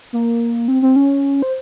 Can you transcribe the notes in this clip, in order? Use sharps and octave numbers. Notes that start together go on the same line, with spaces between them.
A#3
C4
C4
C#4
C5